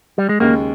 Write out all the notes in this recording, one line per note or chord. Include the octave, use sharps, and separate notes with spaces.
G3
G#3
D#2 C#3 G#3 A#3